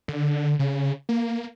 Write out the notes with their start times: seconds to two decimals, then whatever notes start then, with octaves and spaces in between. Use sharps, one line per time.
0.08 D3
0.59 C#3
1.09 A#3